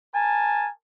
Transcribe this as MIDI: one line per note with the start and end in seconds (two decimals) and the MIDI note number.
0.13 0.69 70
0.13 0.69 80
0.13 0.69 81